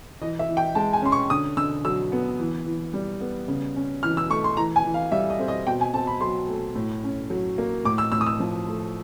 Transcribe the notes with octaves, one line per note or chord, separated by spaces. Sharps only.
E3 D#5
E5
E3
G5
G#3 A5
G#5
C#4 C6
C#6
D3 D#6
D3 E6
F#3 E6
B3
E3
E3
G3
B3
C#3
C#4
E3 F6
E6
A3 C#6
C6
E3 A#5
G#5
E3
F5
G3 E5
D#5
C4
D#5
B2 G5
G#5
C4 A5
B5
F#3 C6
A3
A2
C#4
F#3
A#3
A2 D6
E6
A2 E6
D#6
E6
F3
A3